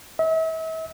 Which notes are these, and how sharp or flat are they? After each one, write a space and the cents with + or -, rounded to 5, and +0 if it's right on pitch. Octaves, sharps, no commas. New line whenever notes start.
E5 -40